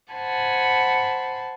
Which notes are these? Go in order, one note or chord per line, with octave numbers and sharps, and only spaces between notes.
C5 F#5 G#5 A5 B5